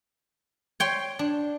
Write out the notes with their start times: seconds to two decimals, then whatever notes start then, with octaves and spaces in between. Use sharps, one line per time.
0.80 C#5 G5 C6
1.19 D4